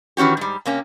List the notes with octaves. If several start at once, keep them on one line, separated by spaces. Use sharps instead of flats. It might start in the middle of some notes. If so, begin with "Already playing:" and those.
D#3 E3 C#4 F#4 G4
G#2 G3
C3 A#3 C#4